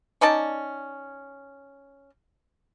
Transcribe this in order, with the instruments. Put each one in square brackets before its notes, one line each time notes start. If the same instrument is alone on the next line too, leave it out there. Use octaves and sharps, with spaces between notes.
[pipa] C#4 D#4 D5 A5